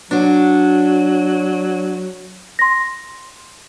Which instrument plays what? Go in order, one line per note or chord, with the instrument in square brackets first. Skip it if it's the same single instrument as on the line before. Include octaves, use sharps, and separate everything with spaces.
[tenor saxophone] F#3 [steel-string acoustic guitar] D4 F#4
[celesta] C6 A#6